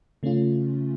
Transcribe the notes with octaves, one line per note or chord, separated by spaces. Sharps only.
C#3 A3 C#4 F4